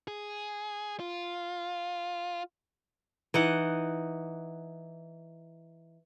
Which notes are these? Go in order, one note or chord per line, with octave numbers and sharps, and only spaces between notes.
G#4
F4
E3 D#4 F#5